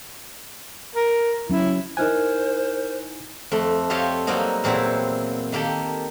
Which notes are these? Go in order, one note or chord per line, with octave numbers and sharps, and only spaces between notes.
A#4
F#3 C#4 E4
D#4 E4 A#4 C5 G#5 F6 F#6
F2 A3
F4 G4 A4 C#5 D#5 F5
F#3 G3 A#3 C4 D#4
E2 A#2 F#3 C4 E4
D#3 A#3 G4 A4